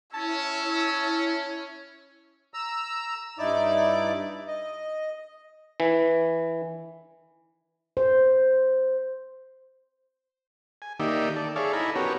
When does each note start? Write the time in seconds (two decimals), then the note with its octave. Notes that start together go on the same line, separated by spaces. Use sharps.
0.14 C#4 E4 C#5 A5 E6
2.54 A#5 E6
3.39 G2 D#4 E4 D5 D6
4.48 D#5
5.80 E3
7.97 C5
10.82 G#5
11.00 D#3 A#3 D#4 G4 D5 E5
11.36 A4 D5
11.56 G#4 A4 C#5 D5 E5 F5
11.73 D#4 E4 A4 G#5 A#5 B5
11.96 B3 C#4 F#4 G4 A#4 C#5